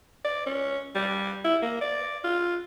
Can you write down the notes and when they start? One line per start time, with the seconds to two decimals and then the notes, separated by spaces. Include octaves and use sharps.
0.25 D5
0.46 C#4
0.95 G3
1.44 E4
1.62 A#3
1.81 D5
2.24 F4